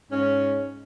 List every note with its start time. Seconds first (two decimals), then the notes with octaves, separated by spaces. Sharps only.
0.10 G#2 C#4